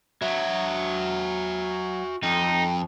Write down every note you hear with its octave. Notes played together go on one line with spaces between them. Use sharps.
F#3 F#4 E5
F2 D#4